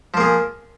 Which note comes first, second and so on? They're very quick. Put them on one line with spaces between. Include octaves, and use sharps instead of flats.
F3 A#3 G#4